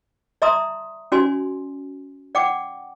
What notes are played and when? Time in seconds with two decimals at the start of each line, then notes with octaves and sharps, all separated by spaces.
0.42 D5 E5 A5 A#5 C6 D#6
1.12 C#4 F#4 D5 G#5 C6
2.35 D5 F#5 G5 D6